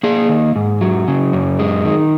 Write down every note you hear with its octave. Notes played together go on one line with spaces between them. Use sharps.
A#3 G#4
D#3
G#2
F#3
C#3
F#2
G#3
D#3